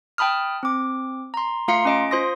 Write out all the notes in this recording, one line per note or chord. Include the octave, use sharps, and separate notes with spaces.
G5 A5 B5 D#6 F6
C4 D6
A#5 C6
A3 F4 F5 A#5 C6 C#7
C#4 D#5 D7
F4 C5 C6 D#6 A#6